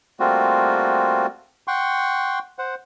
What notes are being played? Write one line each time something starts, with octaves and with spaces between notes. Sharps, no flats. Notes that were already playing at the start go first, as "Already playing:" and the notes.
G3 A3 A#3 C4 F4 F#4
F#5 G5 C6 C#6
C5 F#5